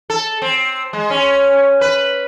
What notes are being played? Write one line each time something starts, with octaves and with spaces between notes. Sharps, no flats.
A4
C4
G#3
C#4
B4